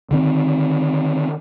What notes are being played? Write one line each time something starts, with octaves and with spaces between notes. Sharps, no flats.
D3 D#3 C4